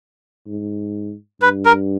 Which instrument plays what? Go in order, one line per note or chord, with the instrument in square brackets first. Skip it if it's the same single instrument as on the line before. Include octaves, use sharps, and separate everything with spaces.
[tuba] G#2
[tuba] G2 [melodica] B4
[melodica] A#4